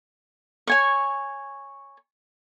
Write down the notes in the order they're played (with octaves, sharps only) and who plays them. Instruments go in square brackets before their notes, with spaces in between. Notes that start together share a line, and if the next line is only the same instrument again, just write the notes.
[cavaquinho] C#5 G#5 C#6